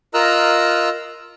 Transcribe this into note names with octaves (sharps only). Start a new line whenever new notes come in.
F4 A#4 D#5 A#5 E6 F#6